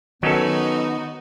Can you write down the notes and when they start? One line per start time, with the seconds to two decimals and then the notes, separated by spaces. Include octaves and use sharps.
0.23 D#3 F#3 B3 C#4 D#4 F#4 A4